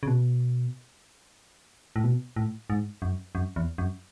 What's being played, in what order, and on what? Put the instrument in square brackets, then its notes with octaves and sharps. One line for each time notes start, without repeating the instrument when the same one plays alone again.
[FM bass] C#3
B2
A2
B2
A2
G#2
F#2
F#2
E2
F#2